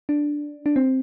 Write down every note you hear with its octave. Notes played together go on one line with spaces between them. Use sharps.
D4
D4
C4